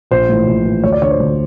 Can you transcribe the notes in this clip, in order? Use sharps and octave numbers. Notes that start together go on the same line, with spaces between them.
A#1 C5
A2 E3
A#1
A2 E3
D2 C#5
D5
D3 C#5
C5
D2